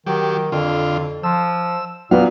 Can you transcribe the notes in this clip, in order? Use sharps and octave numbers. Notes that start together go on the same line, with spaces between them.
D#3 F#3 G4
F2 D3 F4
F3 E6
A#2 F#3 B3 F5